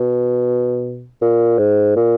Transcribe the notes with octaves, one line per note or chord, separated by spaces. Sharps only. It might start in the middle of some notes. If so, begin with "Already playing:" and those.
Already playing: B2
A#2
G#2
A#2